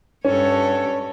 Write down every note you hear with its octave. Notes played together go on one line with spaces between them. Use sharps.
G2 C#4 A4 C#5